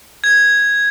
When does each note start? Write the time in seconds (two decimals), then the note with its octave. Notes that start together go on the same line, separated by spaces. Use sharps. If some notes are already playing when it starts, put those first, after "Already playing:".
0.24 G#6